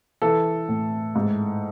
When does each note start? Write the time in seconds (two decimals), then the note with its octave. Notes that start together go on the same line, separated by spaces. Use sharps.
0.22 E3 A4
0.68 A2
1.15 G#2